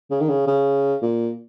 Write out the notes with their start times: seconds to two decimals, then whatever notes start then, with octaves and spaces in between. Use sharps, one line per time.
0.11 C#3
0.21 D#3
0.29 C#3
0.47 C#3
1.02 A#2